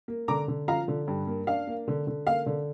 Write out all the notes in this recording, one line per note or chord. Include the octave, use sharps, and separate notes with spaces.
A#3
D3 A#5 D6
D3
F3 F5 A#5
D3
G2
A#3
D4 F5
A#3
D3
D3
A#3 F5
D3